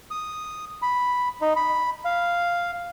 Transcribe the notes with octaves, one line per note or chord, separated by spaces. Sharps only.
D#6
B5
D#4
B5
F5